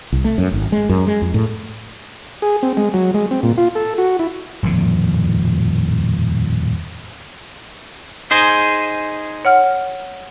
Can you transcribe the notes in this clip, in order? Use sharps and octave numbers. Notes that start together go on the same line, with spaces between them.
C2
A3
F#2
G#1
G#3
F#2
G#3
F2
A2
G#4
C4
G#3
F#3
G#3
C4
A#2
F4
A4
F#4
E4
D#1 F2 A2 D3
D#4 G#4 C5
C#5 F#5 F6